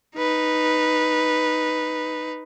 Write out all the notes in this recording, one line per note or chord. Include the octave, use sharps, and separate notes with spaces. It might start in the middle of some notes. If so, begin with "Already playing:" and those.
D#4 B4